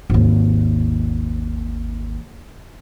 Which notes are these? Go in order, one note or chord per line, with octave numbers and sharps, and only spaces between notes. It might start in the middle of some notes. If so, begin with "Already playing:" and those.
G#1 D#2